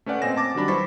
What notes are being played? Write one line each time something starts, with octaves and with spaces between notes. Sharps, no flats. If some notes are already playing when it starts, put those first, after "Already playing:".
A3 C#4 B4 D5 F#5
A#2 C4 D#5 G#5 A#6 E7
A5 D6 A6
D#3 F#3 G3 D4 B5
E4 B4 C5 C#6 A6 B6